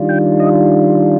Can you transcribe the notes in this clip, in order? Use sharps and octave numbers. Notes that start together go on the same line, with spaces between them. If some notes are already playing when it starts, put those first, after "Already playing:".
Already playing: D#3 G3 D4 F4
G5
D#5